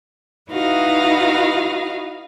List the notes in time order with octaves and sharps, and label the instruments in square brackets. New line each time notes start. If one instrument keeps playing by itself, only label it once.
[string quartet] D#4 E4 F#4 B4 D#5 F5